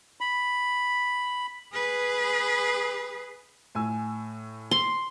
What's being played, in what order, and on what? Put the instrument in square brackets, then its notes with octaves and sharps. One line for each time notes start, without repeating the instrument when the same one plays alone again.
[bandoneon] B5
[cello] G#4 B4
[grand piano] A2 G#5 E6
[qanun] C6